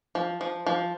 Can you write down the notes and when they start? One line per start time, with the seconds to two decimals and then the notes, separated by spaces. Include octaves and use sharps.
0.15 F3
0.41 F3
0.66 F3